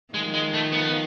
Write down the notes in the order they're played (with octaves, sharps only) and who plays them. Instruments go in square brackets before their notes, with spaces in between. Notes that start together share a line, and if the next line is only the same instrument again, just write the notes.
[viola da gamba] D#3 F3 [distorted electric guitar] G#3
[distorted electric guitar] G#3
A3
B3